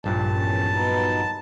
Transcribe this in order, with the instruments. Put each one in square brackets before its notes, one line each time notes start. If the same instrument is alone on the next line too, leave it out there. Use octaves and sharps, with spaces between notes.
[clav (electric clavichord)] A#1 G2 A#2 [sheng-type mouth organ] A5
[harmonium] E2 C#4
F#3 B3 D#4